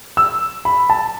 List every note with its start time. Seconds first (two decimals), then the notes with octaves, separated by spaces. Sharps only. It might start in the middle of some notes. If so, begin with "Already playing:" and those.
0.17 E6
0.65 B5
0.90 A5